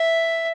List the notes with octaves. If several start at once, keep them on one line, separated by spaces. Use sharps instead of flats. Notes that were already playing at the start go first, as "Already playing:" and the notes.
Already playing: E5